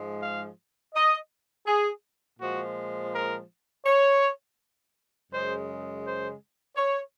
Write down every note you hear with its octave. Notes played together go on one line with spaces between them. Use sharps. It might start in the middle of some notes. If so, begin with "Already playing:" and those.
Already playing: G#2 F3 G#3
F5
D#5
G#4
A#2 F3 G#3 F#4
A#4
C#5
F#2 C#3 G#3 C5
C5
C#5